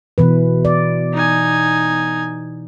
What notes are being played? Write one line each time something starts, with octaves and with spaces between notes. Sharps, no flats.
B2 E3 B4
D5
D#4 G#5